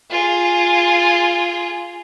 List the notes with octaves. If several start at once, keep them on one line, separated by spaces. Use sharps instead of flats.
F4 G#4